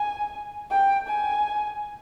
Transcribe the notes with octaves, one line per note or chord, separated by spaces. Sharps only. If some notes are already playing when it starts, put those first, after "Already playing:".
Already playing: G#5
G5
G#5